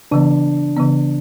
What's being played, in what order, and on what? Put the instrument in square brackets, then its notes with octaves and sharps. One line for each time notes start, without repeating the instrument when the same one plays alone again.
[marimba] C#3 E3 B3 [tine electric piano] D4
[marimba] C#3 E3 B3